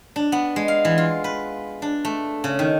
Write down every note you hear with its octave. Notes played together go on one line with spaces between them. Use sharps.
D4
B3
G#3
F5
E3
F4
B4
D4
A3
C#3
D#3